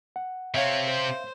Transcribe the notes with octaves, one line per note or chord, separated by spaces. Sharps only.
F#5
C3 C4 C#5 E5 F5
C5